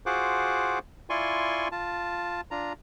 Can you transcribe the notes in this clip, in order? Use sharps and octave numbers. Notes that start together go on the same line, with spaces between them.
F4 F#4 G#4 C5 F#5 D6
E4 F4 D5 G#5 C6 C#6
F4 A5
D4 F4 A#5